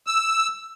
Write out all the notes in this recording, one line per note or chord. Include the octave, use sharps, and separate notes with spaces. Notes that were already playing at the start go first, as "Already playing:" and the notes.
E6